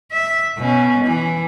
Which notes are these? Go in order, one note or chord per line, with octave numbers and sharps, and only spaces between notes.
E5
B2 C#4
E3